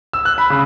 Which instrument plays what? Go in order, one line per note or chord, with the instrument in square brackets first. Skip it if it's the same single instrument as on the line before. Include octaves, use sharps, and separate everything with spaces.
[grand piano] E6
F#6
B5
C#3